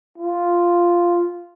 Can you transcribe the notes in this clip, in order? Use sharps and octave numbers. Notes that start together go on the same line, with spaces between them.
F4